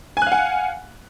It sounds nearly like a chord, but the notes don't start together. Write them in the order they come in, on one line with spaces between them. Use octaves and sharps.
G#5 F#6 F5 F#5